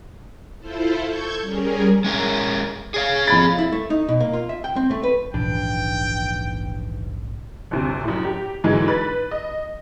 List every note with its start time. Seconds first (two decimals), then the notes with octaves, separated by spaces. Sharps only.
0.59 E4 F4 A4 C5
1.04 A4 C#6 G6 G#6
1.41 G3 C#4 G#4 A#4
2.04 G#3 C#4 A#4
2.94 G#4 C#5 F5
3.27 F2 B5 A6
3.58 E4
3.72 A3
3.90 D#4
4.09 B2
4.20 A#3
4.33 F4
4.49 E5
4.64 G5
4.76 C4
4.91 A3
5.04 B4
5.34 D#1 A#1 G#2 C#3 E3 D4 G5
7.71 G1 D2 C3
8.04 F#2 A2
8.25 G4
8.64 G#2 D3 E3 F#3 G#3
8.88 B4 A6
9.31 D#5